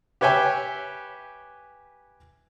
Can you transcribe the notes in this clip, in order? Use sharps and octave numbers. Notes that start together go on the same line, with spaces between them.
G4 B4 C#5 E5 G5 G#5